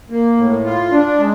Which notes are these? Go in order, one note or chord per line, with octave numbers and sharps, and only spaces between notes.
A#3
A2
F4
D4
G#3